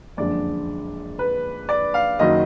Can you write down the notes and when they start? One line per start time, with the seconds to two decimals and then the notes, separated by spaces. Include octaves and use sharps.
0.17 F#1 F2 D3 G#3 D4 D5
1.19 B4
1.69 D5
1.94 F5
2.19 F#1 D#3 F#3 D#5